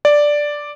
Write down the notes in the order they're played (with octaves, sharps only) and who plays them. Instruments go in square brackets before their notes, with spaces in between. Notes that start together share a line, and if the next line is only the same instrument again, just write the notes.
[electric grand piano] D5